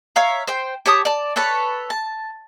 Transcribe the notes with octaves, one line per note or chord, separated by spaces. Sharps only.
C#5 E5 F5 A#5
C5 G5
G4 C#5 A5 D#6
D5 A5
A4 B4 C#5 A5
A5